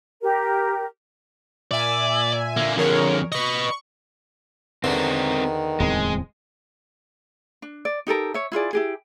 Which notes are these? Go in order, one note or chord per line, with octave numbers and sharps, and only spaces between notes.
G4 A#4
A#2 D5 E5 G#5
D3 A#3
F2 D3 G#4 A#4 C#5
B4 D#5 C#6
E2 D3 D#3 C4 A#4
D1 E2 G#3 C4
D4
D5
D#4 G4 A4 A#4
C#5 E5
E4 F4 G#4 D5
E4 G4 G#4